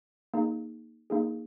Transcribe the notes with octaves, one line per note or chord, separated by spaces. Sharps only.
A#3 D#4 G#4
A#3 D#4 G#4